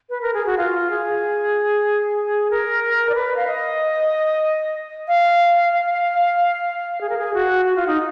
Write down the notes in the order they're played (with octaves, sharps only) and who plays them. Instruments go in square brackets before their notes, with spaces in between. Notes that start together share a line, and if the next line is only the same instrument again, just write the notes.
[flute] B4
A#4
G#4
F#4
F4
G#4
A#4
D5
B4
F5
D#5
F5
F5
G#4
A#4
G#4
F#4
F#4
F4
D#4